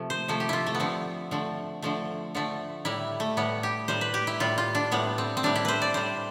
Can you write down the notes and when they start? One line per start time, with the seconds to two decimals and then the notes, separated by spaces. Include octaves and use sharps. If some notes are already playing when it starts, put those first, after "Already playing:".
Already playing: C3 F3 A3
0.10 C5
0.28 C3 F3 A3
0.40 G4
0.49 E4 F4
0.67 A3
0.75 B3
0.80 D3 F3 A3 C4
1.31 D3 F3 A3
1.82 D3 F3 A3
2.35 D3 F3 A3
2.85 A2 G3 E4
3.20 A3
3.37 A2 G3 B3
3.63 G4
3.88 A2 G3 C5
4.01 B4
4.14 G4
4.27 E4
4.40 A2 G3 F4
4.58 F4
4.75 D4
4.92 A2 G3 B3
5.18 C4
5.37 C4
5.43 A2 G3 D4
5.56 E4
5.65 B4 C5
5.82 D5
5.94 A2 G3 C5